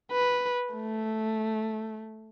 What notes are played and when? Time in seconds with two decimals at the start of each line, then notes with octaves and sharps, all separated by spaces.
0.12 B4
0.75 A3